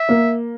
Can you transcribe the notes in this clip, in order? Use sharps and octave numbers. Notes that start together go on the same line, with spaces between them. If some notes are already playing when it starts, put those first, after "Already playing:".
Already playing: E5
A#3